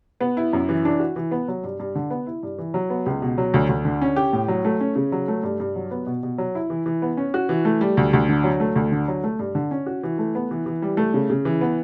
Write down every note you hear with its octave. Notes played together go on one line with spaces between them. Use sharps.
B3
E4
F#2
E3
D4
F#4
E3
B3
F#3
G2
G2
D3
B3
E4
G2
E3
F#3
B3
C#2
B2
F#3
D2
D2
D3
C#4
G4
A2
F#3
A3
C#4
C#3
F#3
A3
G2
G2
F#3
B3
B2
B2
F#3
E4
E3
E3
B3
C#4
F#4
E3
A3
G3
D2
D2
D3
F#3
A3
D2
D3
F#3
A3
G2
D3
C#4
F#4
E3
A3
B3
E3
E3
G3
A3
C#3
C#3
E3
B3